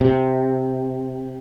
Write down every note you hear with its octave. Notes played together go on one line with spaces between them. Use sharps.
C3